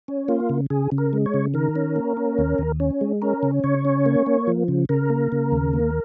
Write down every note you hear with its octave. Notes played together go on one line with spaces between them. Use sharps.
C#4
A#3 F4
C#3
C#3 G#4
C#3
A#4
G#3
C#5
C#3
D#3 A#4
C#4
A#3
C#4
D#2
D#2
C#4
G#3
C#4 A#4
C#3
C#3 C#5
C#4
A#3
A#3
F3
C#3
C#3 A#4
A#3
C#3
D#2
A#3